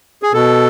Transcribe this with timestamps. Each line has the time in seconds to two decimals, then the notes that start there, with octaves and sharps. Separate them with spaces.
0.23 G#4
0.33 B2 A4